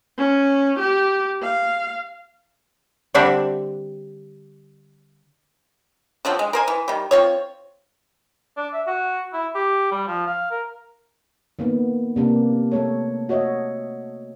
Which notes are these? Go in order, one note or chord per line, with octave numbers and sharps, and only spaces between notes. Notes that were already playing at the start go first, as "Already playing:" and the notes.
C#4
G4
F5
D3 G3 C4 D4 E5 F#5
D3 F3 F#3 C4
G#3
A#4 C5 G#5
E3
D#3 G3
C4 F4 C#5
D4
E5
F#4
E4
G4
G3
F3
F5
A#4
D#3 A#3 B3
C3 A#3 D4
A3 A4 C#5
F#4 C#5 D#5 E5